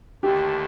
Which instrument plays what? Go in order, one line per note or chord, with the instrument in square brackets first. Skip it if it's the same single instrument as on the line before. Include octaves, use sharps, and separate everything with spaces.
[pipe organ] D#2 D3 A3 [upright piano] G4